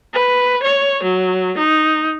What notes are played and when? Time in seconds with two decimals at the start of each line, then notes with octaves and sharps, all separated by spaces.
0.14 B4
0.63 C#5
1.03 F#3
1.57 D#4